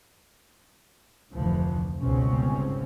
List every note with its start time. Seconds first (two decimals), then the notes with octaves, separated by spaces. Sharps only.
1.33 F1 D2 E3 F3
2.01 G1 C#2 G#2 B2 C4 C#4